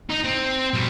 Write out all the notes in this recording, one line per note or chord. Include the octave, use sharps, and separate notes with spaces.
D#4
C4
B2 G3